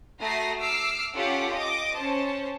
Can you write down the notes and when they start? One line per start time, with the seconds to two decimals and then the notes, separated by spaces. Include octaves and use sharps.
0.20 A3 F#4 A#5 D#6 A#6 C7
0.60 D6 E6 F6 C7
1.14 C#4 F4 G4 A4 F#5 D6
1.53 D#5 D6
1.96 C#4 C5 A5